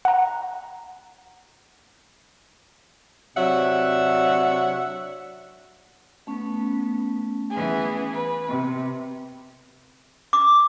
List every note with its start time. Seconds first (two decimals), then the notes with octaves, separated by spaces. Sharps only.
0.05 F#5 A#5
3.37 C3 F#3 D4 E5 F#5
6.27 A3 B3 C#4
7.51 E3 B3 G#4
8.13 B4
8.48 C3
10.33 D6